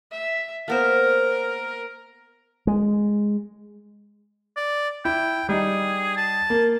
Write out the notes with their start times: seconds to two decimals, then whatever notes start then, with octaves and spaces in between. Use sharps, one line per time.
0.12 E5
0.68 A#3 B3 A#4 C5
2.67 G#3
4.56 D5
5.05 E4 G5
5.49 G3 D#4 G#4
6.17 A5
6.50 A#3